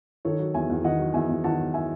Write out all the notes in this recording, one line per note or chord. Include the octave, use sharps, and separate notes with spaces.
D#3 A4 C#5
F#3
E2 E5 G#5
E2
D#3 D#5 F#5
F#3
E2 E5 G#5
E2
D#3 F#5 A5
F#3
E5 G#5